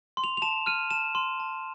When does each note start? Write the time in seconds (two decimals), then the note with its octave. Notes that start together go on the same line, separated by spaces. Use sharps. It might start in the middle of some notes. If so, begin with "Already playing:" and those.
0.17 C6
0.24 F7
0.37 F7
0.42 A5 E7
0.66 F6 D#7
0.90 A5 E7
1.15 C6
1.40 A5